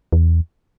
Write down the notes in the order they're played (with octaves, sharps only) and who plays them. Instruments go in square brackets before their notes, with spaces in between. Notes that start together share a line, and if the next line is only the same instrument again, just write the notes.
[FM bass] E2